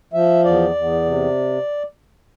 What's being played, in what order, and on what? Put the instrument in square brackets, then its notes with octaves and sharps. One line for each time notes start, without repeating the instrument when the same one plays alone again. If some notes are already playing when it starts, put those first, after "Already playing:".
[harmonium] F3 E5
E2 D5
E2
C3